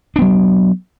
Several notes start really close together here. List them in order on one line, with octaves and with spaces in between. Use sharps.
D4 B3 F#3